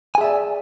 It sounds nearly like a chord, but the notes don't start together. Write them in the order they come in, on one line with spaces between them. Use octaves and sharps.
G#5 G#4 E5 D5